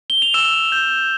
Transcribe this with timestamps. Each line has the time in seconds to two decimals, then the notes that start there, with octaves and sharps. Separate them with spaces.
0.10 G7
0.22 F7
0.34 E6 E7
0.72 G6